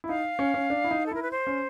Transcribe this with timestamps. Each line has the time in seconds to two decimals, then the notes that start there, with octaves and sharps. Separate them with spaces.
0.04 E4
0.08 D#4 F5
0.39 C#4
0.54 C#4
0.70 D4
0.84 E4
0.91 D#4
1.06 A4
1.12 E4 A#4
1.23 B4
1.31 C5
1.47 C#4